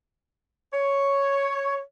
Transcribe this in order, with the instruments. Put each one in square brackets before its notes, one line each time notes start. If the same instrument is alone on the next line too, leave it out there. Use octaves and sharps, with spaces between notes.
[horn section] C#5